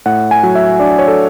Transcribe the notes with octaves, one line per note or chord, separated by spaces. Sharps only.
A2 F#5
G#5
F#3
E5
D4 D5
C#5
A4